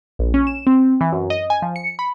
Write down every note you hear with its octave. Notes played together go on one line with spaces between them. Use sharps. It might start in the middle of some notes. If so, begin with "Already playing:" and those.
A#1
C#4
E7
C4
E3
F#2
D#5
G#5
F3
C#7
B5